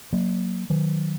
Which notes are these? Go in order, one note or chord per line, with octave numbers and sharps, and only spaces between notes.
F#3 A#3
D#3 F#3